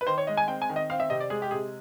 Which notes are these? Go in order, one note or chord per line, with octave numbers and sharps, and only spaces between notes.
B4
D#3 C5
C#5
G#3 D#5
G#5
C4 G5
G#5
D#3
D#5
C4 F5
E5
C3 D#5
D5
G#3 G#4
G4
C3 G#4